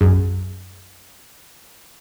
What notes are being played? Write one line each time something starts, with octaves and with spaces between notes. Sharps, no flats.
B1 F#2 G#4